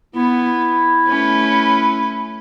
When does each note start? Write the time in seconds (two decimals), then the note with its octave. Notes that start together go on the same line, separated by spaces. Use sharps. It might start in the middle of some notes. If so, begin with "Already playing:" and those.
0.15 B3 E4
1.07 A3 C#4 B4